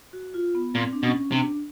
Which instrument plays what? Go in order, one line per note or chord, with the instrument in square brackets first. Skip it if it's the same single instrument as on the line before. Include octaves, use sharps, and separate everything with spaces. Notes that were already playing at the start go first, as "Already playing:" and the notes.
[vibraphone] F#4
F4
B3
[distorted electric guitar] A#2 [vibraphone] C4
[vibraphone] D4
[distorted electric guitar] B2 [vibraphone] C#4
[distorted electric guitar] C3 [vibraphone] D4